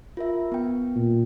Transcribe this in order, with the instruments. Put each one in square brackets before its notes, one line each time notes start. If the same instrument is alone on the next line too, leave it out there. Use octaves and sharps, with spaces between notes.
[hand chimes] F4 A#4 E5
B3 G5
[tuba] A#2